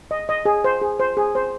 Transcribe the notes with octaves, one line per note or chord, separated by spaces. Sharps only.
D#5
D#5
G#4
C5
G#4
C5
G#4
C5